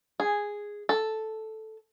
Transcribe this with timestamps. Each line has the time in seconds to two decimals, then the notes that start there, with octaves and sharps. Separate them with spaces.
0.20 G#4
0.89 A4